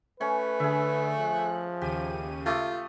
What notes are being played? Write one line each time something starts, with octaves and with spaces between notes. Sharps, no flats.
A3 C#4 B4
D3 G#4 E5
F3 F#6
D#2 C#3 G4 D#7
A3 F4 D6 D#6